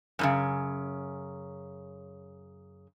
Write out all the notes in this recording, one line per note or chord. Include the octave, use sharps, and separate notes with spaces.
F#2 A2 C#3